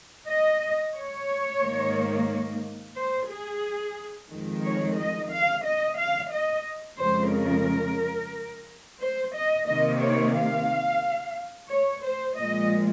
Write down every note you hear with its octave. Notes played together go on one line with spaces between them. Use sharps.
D#5
C#5
G#2 D#3 A#3
C5
G#4
F2 D#3 G#3
C#5
D#5
F5
D#5
F5
D#5
F2 C#3 G#3 C5
A#4
C5
D#5
C3 D#3 A#3 D#5
C#5
F5
C#5
C5
A#2 F3 G#3 D#5